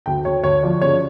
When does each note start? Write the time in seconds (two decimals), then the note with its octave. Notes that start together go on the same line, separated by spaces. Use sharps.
0.06 D2 G5
0.25 D2 C#5
0.44 D2 C#5
0.63 F3 D5
0.82 C#3 C#5